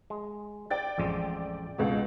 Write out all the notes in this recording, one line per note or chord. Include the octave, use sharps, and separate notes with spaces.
G#3
D5 G5 A6
A1 F2 G#3
C#2 B2 F#4